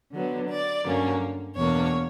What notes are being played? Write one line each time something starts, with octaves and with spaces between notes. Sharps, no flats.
D3 F#3 B3
D5
G2 D3 F#3 A#3 C#4
E2 B2 A#3 D4 C#5